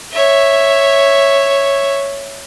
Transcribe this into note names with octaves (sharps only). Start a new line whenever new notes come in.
C#5 E5